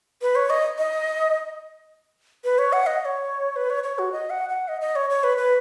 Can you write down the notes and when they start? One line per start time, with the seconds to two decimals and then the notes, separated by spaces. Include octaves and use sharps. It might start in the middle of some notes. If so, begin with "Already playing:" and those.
0.22 B4
0.35 C#5
0.50 D#5
0.78 D#5
2.44 B4
2.58 C#5
2.73 F#5
2.87 D#5
3.01 D#5
3.05 C#5
3.56 B4
3.70 C#5
3.84 C#5
3.99 F#4
4.12 D#5
4.30 F#5
4.49 F#5
4.68 D#5
4.81 D#5
4.96 C#5
5.10 C#5
5.24 B4
5.38 B4